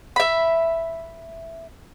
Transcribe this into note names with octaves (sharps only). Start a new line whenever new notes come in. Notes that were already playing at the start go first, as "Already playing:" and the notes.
E5 B5